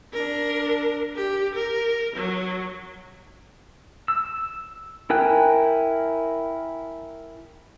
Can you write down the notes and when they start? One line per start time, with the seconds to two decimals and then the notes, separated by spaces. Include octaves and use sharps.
0.13 D4 A#4
1.15 G4
1.55 A#4
2.16 F#3
4.08 E6
5.10 E4 A#4 G5 G#5 F#6